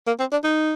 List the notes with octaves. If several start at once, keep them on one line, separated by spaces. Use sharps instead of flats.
A#3
C4
D4
D#4